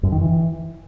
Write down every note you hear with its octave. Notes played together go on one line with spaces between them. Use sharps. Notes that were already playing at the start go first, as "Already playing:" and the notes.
F#2
D#3
E3